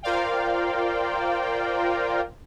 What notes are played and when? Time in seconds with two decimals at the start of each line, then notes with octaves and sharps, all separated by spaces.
0.02 F4 A#4 C5 D5 F5 G5